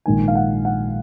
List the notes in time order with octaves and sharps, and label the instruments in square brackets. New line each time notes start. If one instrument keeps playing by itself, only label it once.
[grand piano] A#1 G#2 D#3 G#5
F5
F#5
F#5